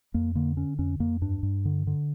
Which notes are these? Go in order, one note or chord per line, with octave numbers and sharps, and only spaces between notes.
F2 A#3
D3 A#3
D3 C#4
F2 C#4
F2 A#3
G2 D4
G2
D3
D3